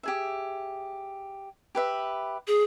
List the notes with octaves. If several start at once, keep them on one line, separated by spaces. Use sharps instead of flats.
G4 G#4 E5
G4 B4 E5
G#4